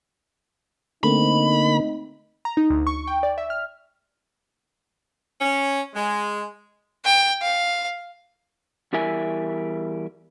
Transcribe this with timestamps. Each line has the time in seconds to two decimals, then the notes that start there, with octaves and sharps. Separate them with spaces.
1.03 D3 A3 A#3 C4 D#4 B5
2.45 A#5
2.57 D#4
2.70 D2
2.87 C#6
3.07 G5
3.23 D5
3.38 E5
3.50 F6
5.41 C#4
5.94 G#3
7.05 G5
7.42 F5
8.93 E2 G3 E4 A#4 E5 G#5